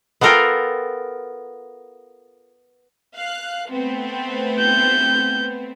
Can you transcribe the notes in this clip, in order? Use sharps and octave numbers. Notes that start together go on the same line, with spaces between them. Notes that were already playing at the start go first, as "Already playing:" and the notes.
B3 F4 A4 A#4 F5 G5
F5 F#6
A3 B3 C4
G6